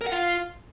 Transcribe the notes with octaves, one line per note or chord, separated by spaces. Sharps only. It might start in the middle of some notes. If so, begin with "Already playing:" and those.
A#4
F#5
F4